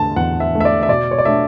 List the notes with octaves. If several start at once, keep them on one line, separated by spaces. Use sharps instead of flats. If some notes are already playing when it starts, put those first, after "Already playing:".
Already playing: E2 D3 A3 A5
E2 F#5
E5
D3 A3
E5
D5
E5
B2 D5
C#5
D5
A3 D4 E5